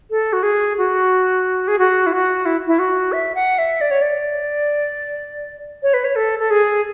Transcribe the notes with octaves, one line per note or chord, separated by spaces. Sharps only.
A4
F#4
G#4
F#4
G#4
F#4
E4
F#4
E4
E4
F#4
E5
F#5
E5
D5
C#5
D5
C#5
B4
C#5
A4
A4
G#4